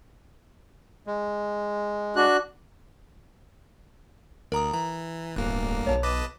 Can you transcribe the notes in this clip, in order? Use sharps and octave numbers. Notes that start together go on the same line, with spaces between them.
G#3
D4 F#4 F#6
D2 A#4 A#5 D#6
E3 A#5
D1 G1 D2 A#3 F#6
B1 C#5 A5
B4 D#5 A5 D6